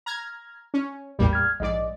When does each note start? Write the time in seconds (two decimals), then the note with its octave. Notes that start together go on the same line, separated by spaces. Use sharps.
0.06 A#5 F6 G#6
0.74 C#4
1.19 A1 E2 A2 G3 A#3 G4
1.33 F6 G#6
1.60 A#1 G#2 D5 D#5